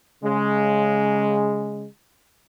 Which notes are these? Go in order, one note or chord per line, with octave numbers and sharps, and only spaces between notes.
C#3 G#3